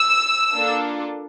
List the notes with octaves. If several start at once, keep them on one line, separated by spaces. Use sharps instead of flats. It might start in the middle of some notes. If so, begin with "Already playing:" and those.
Already playing: E6
A#3 D4 F4 A4